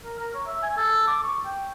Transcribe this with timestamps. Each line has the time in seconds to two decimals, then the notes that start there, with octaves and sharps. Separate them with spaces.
0.04 A#4
0.19 A#4
0.34 C#5
0.47 E5
0.63 G#5
0.77 A4
1.07 D6
1.24 C#6
1.45 G5